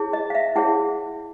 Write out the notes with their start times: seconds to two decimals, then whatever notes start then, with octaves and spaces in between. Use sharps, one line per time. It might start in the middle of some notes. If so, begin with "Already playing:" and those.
Already playing: E4 G#4 C#5
0.13 D#5
0.30 F5
0.35 E5
0.55 E4 G#4 C#5 F#5